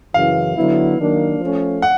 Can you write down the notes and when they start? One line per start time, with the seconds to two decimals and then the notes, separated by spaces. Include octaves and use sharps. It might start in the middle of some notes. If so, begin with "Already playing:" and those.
0.14 F#2 C#3 E3 F5
0.56 D3 F#3 B3 E4
0.98 D#3 F#3 A#3 D4
1.40 F3 A3 C#4
1.82 F#5